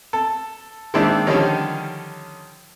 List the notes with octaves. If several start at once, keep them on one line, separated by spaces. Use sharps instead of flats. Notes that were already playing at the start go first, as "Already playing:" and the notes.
A4
D#3 G#3 A#3 C4 D4 E4
D3 D#3 F3 G3 C#4 D#4